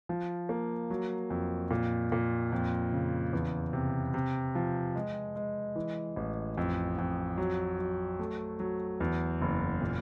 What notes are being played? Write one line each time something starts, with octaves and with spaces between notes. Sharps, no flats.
F3
A#3
F#3
F2
A#2
A#2
F2
C#3
E2
C3
C3
F3
G#3
G#3
E3
A1
F2
F2
F#3
F#3
A3
F#3
E2
F#1
A#2